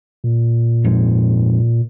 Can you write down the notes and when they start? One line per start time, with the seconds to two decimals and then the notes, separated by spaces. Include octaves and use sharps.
0.24 A#2
0.84 F2 G#2